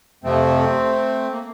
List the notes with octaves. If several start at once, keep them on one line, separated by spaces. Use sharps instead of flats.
F2 C3 F3 A3 C4
A#3